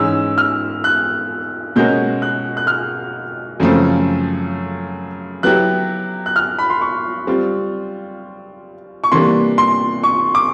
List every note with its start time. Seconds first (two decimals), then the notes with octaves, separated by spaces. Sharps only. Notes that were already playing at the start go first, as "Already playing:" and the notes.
Already playing: G#2 E3 G#3 C#4 E6
0.38 F6
0.84 F#6
1.76 B2 G#3 C#4 F#4 A#4 G6
2.22 F#6
2.57 F#6
2.67 F6
3.60 F#2 C#3 F3 A3 C4
5.43 F#3 B3 E4 G4 F#6
6.26 F#6
6.36 F6
6.59 B5
6.70 C6
6.81 C#6
7.27 G3 C4 F4
9.04 C#6
9.12 C3 E3 G3 A#3 D4 C6
9.58 C6
10.03 C#6
10.35 D6